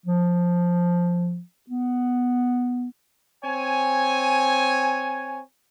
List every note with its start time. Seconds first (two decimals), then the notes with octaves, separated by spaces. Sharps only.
0.06 F3
1.70 B3
3.45 C4 C#5 G#5